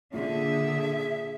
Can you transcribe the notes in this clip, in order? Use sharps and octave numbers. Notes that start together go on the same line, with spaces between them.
A#2 D3 G#4 E5